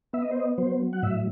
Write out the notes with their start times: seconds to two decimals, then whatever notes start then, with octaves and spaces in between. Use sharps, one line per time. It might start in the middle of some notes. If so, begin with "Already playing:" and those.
0.13 B3 E5
0.22 D#5
0.31 C5
0.40 D#5
0.58 F#3 C5
0.93 F#5
1.02 A2 E5